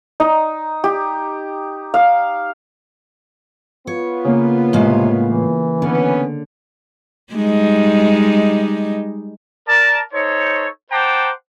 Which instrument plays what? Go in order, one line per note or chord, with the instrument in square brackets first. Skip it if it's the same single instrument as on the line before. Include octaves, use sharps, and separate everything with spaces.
[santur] D#4
G4
F5
[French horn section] B3 F4 [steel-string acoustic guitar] C#5
[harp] C#3 A#3
[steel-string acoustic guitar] A2 G#3 F5 [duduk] C3
[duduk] E3
[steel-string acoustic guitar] D3 [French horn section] B3 C#4
[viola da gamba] G3 G#3 D#4
[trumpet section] A#4 D5 A5
D#4 A4 C5 C#5
C5 F#5 G5 A5 A#5 D6